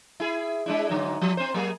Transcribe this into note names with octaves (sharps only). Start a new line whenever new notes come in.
E4 G#4
G#3 D4 E4
G#2 D3 F#3
F3
C4 C5
F#3 A#3 G#4